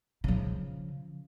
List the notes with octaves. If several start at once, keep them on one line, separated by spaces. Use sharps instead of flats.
C#3 F3